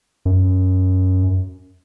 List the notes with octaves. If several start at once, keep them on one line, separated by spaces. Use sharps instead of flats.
F#2